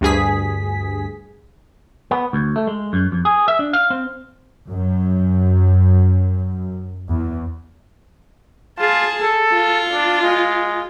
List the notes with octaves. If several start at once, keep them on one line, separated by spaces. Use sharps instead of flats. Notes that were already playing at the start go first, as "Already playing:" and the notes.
D2 G2 G#4 B6
B3
D2
A3
G#3
F#2
F2
G#4
E5
D4
F5
C4
F#2
E2
F4 G#4 A5
A4
F4
D4
G#3